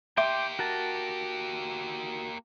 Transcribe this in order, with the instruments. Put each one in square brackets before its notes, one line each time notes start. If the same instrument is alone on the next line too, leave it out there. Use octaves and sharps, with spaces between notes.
[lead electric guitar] A#3 G4 [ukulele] E5 [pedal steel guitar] G5 C6 D6
[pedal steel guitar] F#4 A#4 A5